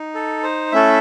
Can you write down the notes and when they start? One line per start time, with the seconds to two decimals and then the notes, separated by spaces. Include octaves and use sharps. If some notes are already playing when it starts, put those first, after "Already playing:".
Already playing: D#4
0.15 A4
0.43 C5
0.72 A3 C#4 E4 A4 E5